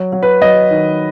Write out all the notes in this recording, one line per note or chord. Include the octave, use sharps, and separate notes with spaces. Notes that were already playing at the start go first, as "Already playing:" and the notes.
Already playing: F#3
F#3
B4
F#3 D#5
D#3